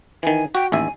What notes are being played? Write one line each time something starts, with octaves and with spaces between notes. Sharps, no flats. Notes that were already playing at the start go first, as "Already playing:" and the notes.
D#3 E3 G#5
F#4 G5
A1 D#2 E5 G#5